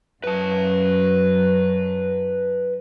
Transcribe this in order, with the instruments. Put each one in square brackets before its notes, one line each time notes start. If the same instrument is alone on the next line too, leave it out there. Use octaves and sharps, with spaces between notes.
[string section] F#2 [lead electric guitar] B4 A5